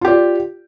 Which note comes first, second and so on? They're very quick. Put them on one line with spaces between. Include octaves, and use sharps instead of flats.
F4 G4 D5